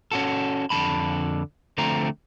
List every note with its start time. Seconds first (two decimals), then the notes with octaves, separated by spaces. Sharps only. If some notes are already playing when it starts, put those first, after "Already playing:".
0.12 C#4 F#4 A4
0.70 F2 D3 G#3 A5 B5
1.78 D3 F3 A3 C4 A#5